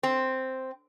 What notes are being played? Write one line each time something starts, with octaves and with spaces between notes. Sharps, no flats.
C4